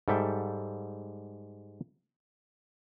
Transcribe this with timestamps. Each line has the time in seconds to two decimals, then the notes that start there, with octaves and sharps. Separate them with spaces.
0.08 G#2 G3 A4 E5 G5